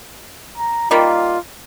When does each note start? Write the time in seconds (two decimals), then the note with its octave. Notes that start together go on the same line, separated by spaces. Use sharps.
0.58 A#5
0.91 D#3 G3 A#3 F4